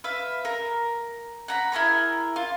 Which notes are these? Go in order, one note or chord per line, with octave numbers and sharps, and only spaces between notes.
B4 E5 F5
A#4
F#5 A#5 B5
E4 G#4 A#4 B5
F4